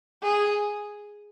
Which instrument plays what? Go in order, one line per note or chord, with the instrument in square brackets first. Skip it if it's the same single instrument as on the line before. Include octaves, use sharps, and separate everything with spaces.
[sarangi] G#4